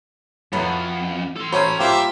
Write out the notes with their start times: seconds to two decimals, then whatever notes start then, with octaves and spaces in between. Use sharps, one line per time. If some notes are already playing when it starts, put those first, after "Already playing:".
0.53 F2 G#2 F#3 B3 E4 A4 B4
1.36 A4 C6
1.52 F#3 A3 C#4 C5 B5
1.79 G3 A#3 F4 G4 C5 E5